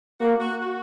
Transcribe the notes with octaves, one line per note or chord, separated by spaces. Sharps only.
A#3 F#4
F#4
F#4